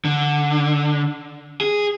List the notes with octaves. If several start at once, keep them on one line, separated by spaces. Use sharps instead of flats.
D3
G#4